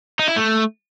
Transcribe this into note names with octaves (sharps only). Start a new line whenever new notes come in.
D#4
E4
A3